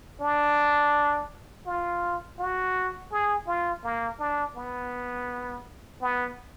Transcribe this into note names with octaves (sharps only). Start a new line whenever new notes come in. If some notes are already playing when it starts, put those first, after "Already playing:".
D4
F4
F#4
G#4
F4
A#3
D4
B3
B3